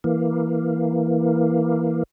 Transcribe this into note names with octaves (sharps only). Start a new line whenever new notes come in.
E3 A#3